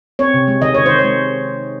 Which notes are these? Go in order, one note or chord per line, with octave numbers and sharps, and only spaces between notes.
C4 C#5
C3
G#3
D#3 D#5
D#3 C#5
D#3 C5
C#5
G#3